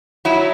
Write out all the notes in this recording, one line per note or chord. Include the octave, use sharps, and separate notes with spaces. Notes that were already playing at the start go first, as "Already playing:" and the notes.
F#3 E4